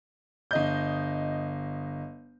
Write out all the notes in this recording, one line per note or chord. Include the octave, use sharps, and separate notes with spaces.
G1 D#5 G6